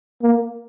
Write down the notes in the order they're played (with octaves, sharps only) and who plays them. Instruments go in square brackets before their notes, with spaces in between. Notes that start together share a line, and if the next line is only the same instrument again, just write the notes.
[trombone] A#3